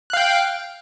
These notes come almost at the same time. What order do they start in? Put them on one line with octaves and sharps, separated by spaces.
F#6 F5 G5